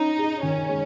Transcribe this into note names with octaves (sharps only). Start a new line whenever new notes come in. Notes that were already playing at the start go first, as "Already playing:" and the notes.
Already playing: C#4 D#4
G#4
D#3 C#4
G#3